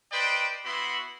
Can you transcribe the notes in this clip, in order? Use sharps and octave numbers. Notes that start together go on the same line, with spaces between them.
B4 C5 D5 D#5 G5
B3 E4 F#4 B5 C6